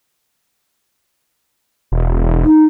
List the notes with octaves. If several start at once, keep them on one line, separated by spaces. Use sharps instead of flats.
E1
D#4